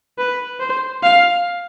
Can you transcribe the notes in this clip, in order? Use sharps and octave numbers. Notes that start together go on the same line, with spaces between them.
B4
C5
F5